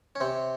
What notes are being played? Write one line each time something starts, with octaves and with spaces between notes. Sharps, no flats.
C#4
C3 C4